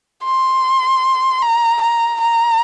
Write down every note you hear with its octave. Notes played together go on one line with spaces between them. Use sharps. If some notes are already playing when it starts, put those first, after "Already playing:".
C6
A#5
A#5
A#5